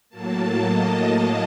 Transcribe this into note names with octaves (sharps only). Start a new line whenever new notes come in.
A2 F#3 A#3 A5
D#5